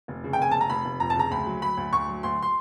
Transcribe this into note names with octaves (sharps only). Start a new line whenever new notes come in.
F1
C#3
G5
F1 G#5
F1 A5
A#5
F1 B5
F1
F2 A#5
A5
C#3 A#5
D2 B5
F#3
F#3 B5
D2
D2 C#6
F#3
D2 C6
C6